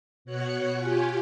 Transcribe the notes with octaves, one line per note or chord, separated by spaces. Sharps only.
B2 F#4 C#5 F#6 C#7
F4 G4 G#5